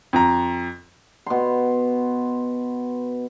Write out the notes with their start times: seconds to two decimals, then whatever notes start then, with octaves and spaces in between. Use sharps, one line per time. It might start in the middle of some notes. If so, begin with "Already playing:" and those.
0.13 F2 A#5
1.26 B2 C6